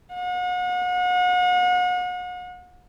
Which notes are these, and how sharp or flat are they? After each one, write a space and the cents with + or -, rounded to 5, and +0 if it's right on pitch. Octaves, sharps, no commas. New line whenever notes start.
F#5 -40